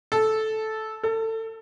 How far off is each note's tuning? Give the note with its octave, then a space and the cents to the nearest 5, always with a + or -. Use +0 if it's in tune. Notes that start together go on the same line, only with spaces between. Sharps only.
A4 -10
A4 +25